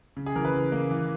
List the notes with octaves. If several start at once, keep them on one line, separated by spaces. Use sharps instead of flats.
C#3
G#4
E3 A#4
B4
C#3
A#3
E3